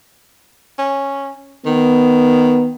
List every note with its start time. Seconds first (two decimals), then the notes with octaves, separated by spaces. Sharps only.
0.79 C#4
1.66 D#3 B3